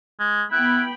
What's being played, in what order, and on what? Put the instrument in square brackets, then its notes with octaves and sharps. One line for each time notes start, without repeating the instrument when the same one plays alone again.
[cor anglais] G#3
[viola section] B3 G5 B5 [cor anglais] E4 [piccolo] F#6